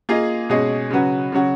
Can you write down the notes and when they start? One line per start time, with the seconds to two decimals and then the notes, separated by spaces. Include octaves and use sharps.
0.09 A#3 F4 G#4 D#5
0.50 B2 G#3 C#4 G#4 D#5
0.91 C#3 F#3 C#4 F#4 B4
1.32 C#3 F#3 C#4 F#4